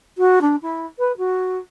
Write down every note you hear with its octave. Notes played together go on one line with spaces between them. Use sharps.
F#4
D4
E4
B4
F#4